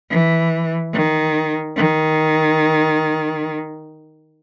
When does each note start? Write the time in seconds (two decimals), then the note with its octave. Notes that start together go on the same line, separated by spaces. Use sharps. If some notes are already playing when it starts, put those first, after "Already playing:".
0.10 E3
0.93 D#3
1.77 D#3